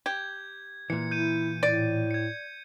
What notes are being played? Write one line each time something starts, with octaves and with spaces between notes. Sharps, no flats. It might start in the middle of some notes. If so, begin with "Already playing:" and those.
G4 G#6
A#2 E3 C#7
E4 G6 D#7
A2 D5
G#6 C#7